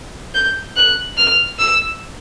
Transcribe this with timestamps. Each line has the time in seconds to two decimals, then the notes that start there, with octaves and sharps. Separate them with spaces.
0.34 G6
0.76 F#6
1.17 F6
1.58 E6